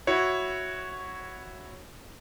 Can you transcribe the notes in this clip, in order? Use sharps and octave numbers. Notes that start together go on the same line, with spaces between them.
E4 F#4 C#5